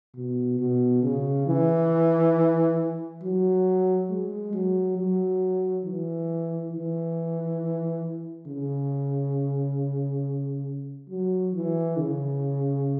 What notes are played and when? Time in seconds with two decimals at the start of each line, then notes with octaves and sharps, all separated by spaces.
0.15 B2
0.59 B2
1.03 C#3
1.47 E3
3.23 F#3
4.10 G#3
4.53 F#3
4.98 F#3
5.85 E3
6.73 E3
8.47 C#3
11.10 F#3
11.54 E3
11.97 C#3